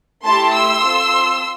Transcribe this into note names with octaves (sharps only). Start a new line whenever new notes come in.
A3 E4 G4 A5 C6
C6 E6
C4 F4 A4